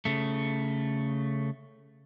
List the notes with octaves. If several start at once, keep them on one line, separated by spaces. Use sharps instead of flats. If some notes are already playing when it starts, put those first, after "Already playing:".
C#3 A3